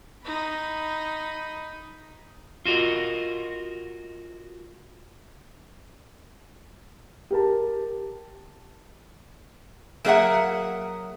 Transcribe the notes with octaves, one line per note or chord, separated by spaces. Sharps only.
D#4 B5
F4 F#4 A#4 D#5
G4 A#4 A5
F#3 A#3 G#4 C#5 E5 F#5